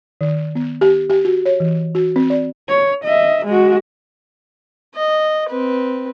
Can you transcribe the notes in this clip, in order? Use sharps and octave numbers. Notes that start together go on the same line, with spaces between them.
D#3
B3
G4
G4
F#4
C#5
E3
F#4
C4
D5
C#5
D#5 E5
G#3 F#4
D#5
C4 B4